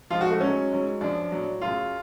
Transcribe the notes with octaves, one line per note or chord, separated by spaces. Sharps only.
G#2 F3 F4
F#4
A3
G#2 F#3 C#4
G#2 F#3
F#2 F3 D4
A2 F#3
F#2 C#3 F#3 F4